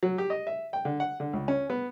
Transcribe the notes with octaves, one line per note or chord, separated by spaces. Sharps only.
F#3
G4
D#5
E5
G5
D3
F#5
D3
C#2
C#4
B3